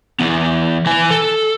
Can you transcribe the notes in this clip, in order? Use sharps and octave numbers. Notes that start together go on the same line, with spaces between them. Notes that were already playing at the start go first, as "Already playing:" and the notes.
E3 B3
E3 G#5
A4